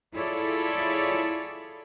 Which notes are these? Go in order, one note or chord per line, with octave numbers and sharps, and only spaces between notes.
E4 F4 G#4 A4 C#5 D5